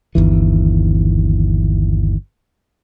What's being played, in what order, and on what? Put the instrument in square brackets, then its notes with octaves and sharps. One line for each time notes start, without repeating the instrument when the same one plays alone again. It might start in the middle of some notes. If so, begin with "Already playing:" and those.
[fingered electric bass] G1 D#2 E3